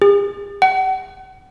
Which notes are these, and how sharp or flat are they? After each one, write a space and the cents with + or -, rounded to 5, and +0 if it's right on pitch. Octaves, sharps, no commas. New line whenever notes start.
G#4 -45
F#5 +35